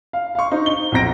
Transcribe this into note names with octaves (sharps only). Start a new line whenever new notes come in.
F5
F5 C#6
D#4 C5
G7
B1 F2 C4 A#5 A#6 D7